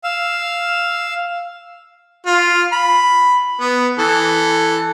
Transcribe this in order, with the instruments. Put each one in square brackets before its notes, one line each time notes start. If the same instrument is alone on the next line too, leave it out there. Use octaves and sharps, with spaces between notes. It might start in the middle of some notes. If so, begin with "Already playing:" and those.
[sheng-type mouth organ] F5 E6
[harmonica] F4
B5
B3
E3 A4